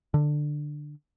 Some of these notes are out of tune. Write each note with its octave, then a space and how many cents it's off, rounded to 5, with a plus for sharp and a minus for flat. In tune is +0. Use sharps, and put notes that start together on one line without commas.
D3 +15